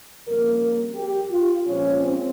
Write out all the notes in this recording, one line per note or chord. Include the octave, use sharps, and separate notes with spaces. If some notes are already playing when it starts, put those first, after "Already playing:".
F2 C#3 G3 A#3 A#4
G4
F4
A#2 F3 G#3 C#4
C4